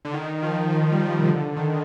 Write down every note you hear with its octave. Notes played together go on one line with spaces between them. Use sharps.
D3
D#3
F3
D#3
G3
F3
C3
D3
D#3